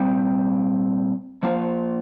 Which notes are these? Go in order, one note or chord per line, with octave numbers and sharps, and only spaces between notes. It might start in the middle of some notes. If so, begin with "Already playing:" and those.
Already playing: A#2 G3 C4
F3 A#3 F4 C5